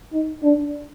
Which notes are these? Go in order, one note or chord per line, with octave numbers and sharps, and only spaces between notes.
D#4
D4